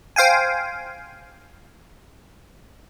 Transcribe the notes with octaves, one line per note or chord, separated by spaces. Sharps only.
C5 F5 G5 G#5